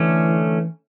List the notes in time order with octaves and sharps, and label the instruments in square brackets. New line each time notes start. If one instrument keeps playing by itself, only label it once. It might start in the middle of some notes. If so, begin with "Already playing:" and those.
Already playing: [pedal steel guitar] D3 A3 C#4 [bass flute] E3